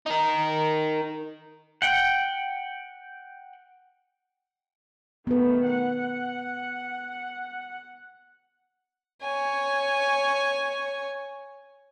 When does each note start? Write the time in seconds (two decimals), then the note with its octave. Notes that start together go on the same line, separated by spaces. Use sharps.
0.06 D#4 A#4
1.82 F#5 G5
5.27 D#3 A3 B3 B4
5.67 F#5
9.23 C#5 G#5